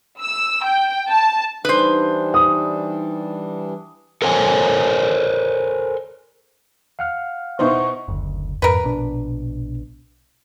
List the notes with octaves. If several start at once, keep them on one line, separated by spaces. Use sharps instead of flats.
E6
G5
A5
E3 G3 D4 D#4 B4 C5
D#6
A4 A#4 C5 C#5 G5 G#5
F5 F#5 F6
B2 B3 D#4 E4 C5 C#6
F#1 D2
F2 G#2 A#4 B4
A#1 B2 D4